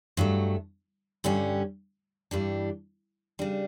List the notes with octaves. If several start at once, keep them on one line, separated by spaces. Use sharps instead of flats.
G2 F#3 A3
G2 D3 G3 C#4
G2 E3 G3 D4
C#3 G3 D4